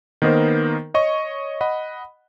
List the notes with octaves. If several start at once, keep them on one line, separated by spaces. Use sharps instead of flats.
D#3 A#3 B3 D#4 A#4 C5
C#5 D#5 C#6
D#5 F#5 B5